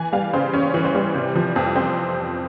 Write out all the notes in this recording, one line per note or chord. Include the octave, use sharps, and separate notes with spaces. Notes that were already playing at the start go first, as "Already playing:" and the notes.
Already playing: E3 G#5
G3 F5
C#3 C5
C#4 C#5
E3
C5
G3
C3
F3
F2
C4 C5